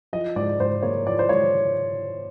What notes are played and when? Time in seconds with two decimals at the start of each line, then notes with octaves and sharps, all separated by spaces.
0.13 F3 D#5
0.36 G#2 D5
0.60 G#2 C5
0.83 A#3 C#5
1.06 F3 D5
1.19 C5
1.29 G#2 C#5